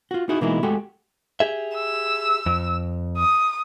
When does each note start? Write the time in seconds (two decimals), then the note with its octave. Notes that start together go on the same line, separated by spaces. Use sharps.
0.11 F4 F#4
0.29 D#4 E4 F#4 G#4
0.41 B2 E3 G#3 A#3 D#4 E4
0.63 G#3 A3 F#4 G4 A4
1.40 G4 G#4 E5
1.75 E6
2.46 F2
3.18 D#6